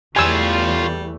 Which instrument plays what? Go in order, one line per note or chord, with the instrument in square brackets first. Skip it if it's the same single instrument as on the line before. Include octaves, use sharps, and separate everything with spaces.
[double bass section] E2 E3 A3 [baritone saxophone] G3 [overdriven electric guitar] F4 C#5 [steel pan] G#5 E6